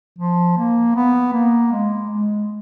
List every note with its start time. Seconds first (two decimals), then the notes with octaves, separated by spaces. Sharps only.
0.18 F3
0.58 A#3
0.96 B3
1.33 A#3
1.72 G#3
2.10 G#3